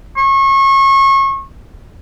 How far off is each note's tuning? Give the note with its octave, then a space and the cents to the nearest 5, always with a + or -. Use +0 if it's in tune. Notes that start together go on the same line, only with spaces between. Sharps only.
C#6 -30